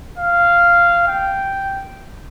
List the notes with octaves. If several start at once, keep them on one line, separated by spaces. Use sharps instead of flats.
F5
G5